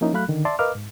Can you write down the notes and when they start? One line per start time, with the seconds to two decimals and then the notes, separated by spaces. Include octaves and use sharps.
0.01 F3 A#3 C#4 D#4 E4
0.13 F#3 A3 F5 B5 F#6
0.28 D3 D#3
0.45 D5 E5 A5 C6
0.59 A#4 B4 D#5 F5 D6 F6
0.75 G#2